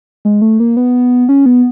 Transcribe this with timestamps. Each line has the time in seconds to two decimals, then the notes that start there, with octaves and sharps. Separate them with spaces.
0.25 G#3
0.42 A3
0.60 A#3
0.77 B3
1.29 C#4
1.46 B3